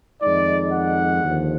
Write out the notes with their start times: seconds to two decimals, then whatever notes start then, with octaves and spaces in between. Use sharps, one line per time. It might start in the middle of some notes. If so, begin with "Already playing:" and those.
0.22 F2 D#3 G#3 D#4 D5
0.72 F#5
1.23 D#2 D3 F3